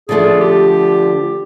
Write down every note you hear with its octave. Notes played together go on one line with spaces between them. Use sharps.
D3 F3 A3 D4 G#4
G4